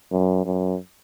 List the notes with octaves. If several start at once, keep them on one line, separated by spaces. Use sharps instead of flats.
F#2
F#2